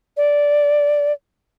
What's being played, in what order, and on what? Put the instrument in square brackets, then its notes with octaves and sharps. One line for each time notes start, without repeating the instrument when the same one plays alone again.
[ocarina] D5